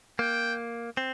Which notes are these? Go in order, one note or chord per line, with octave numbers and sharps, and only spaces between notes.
A#3 G5
C4